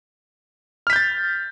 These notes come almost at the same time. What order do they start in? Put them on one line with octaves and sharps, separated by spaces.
F6 B6 G6 A6